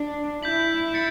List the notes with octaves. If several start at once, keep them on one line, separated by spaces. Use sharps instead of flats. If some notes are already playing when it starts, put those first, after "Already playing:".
Already playing: D4
E4 G6 B6 F#7
A6 C#7